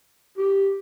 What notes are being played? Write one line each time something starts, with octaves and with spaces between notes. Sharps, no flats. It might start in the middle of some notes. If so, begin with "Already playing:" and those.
G4